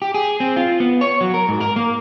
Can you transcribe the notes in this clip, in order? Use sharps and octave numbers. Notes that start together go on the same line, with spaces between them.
G4
G#4
C4
F4
B3
C#5
F#3
A#4
G#2
A#4
A#3